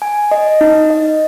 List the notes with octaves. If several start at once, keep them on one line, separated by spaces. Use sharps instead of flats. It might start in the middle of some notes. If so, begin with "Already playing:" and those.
G#5
D#5
D#4
D#5